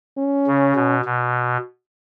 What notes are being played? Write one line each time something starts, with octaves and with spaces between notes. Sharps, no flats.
C#4
C#3
B2
B2